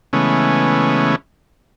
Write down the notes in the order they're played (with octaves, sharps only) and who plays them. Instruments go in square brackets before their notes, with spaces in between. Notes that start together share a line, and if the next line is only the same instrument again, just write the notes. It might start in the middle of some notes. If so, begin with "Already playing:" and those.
[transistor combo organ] C#3 E3 G#3 A3 B3 C#4